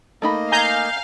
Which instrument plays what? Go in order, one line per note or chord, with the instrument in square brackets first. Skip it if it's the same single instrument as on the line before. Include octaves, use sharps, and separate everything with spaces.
[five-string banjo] A3 D#4 B5 [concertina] A#3 D#5
[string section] F5 [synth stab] G#5 A#5 G6